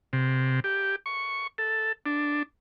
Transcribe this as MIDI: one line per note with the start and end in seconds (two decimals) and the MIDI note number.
0.13 0.60 48
0.64 0.96 67
1.06 1.47 85
1.58 1.92 69
2.06 2.43 62